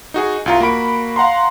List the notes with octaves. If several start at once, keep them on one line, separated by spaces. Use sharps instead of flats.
D#4 F#4 G#4
C2 F4 A#5
A#3 F#4 B5 D7
F5 F#5 A#5 C6